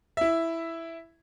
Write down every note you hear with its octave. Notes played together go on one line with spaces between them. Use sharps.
E4 E5